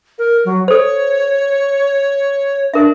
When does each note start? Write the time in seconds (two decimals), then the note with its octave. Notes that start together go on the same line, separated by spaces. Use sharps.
0.19 A#4
0.45 F#3
0.68 A4 C5 C#5
2.74 D4 A#4 E5